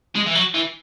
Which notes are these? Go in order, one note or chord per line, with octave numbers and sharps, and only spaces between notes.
G#3
E3
F#3
E3